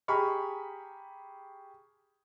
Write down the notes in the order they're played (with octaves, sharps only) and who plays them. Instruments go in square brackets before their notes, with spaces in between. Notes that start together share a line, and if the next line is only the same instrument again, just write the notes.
[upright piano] G4 G#4 A#5 B5 C#6 F6